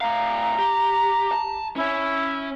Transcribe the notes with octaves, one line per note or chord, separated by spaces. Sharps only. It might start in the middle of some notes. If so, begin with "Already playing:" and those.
A2 F5 A#5
G4
A5
C#4 E4 C#5